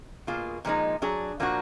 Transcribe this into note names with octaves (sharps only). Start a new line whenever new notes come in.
B2 A#3 F4 G#4
A#2 F3 G#3 D#4
F#3 D4 G#4
A#2 F3 A#3 D4 F#4